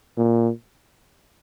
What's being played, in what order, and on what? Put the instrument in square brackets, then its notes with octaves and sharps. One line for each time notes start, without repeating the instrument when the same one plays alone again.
[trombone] A#2